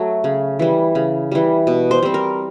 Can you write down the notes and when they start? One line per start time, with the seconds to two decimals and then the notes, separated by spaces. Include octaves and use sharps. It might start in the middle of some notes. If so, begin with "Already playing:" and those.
Already playing: F#3 A3
0.24 C#3
0.59 E3 G3
0.95 C#3
1.31 E3 G3
1.67 B2
1.91 C5
2.03 G3 C4
2.14 A#4